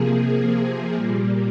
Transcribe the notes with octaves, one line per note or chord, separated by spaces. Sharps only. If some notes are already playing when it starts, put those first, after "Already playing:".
Already playing: C3 F3 A#3 G#4
A#2 G3 A#3